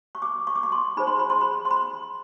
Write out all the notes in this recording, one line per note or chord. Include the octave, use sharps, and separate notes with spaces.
C#6
D6
C#6
D6
C#6
C6
D#4 G#4 C5 B5
C6
B5
C6
B5
C6
B5